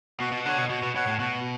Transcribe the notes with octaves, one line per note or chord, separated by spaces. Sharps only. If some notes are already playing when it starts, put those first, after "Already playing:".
B2 F#4
B2
D3 C#5 F#5
B2
B2 F#4
B2
B2 C#5 F#5
A2
B2 F#4